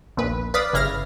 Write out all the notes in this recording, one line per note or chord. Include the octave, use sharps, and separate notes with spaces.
A#1 D#2 A#2 B4
B4 D5 F5 B5 D#6 A6
G1 C#3 E4 F5 F6 A#6